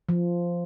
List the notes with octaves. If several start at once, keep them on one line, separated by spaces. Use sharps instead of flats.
F3